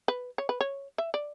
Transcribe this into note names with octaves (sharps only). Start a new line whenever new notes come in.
B4
C#5
B4
C#5
E5
D5